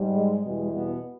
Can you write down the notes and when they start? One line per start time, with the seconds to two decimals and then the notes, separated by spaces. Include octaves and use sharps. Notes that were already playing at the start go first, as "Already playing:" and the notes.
Already playing: G#2 G3
0.15 G#3
0.44 E2 B2 G3 G#3
0.72 B2 B3